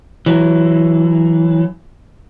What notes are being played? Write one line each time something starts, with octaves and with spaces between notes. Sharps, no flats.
E3 F#3